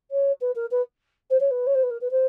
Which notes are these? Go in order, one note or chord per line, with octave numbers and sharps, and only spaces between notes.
C#5
B4
A#4
B4
C5
C#5
B4
C#5
C5
B4
A#4
B4
C5